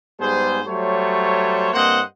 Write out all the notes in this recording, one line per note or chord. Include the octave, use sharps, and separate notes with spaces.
G#2 G3 B3 G#4 C5
F#3 G3 A3 C5 C#5
G2 A#3 C4 C5 D#5 F#5